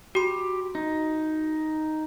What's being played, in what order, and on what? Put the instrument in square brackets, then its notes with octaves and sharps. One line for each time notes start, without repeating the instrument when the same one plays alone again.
[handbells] F#4 C6 [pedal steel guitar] G4
[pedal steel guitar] D#4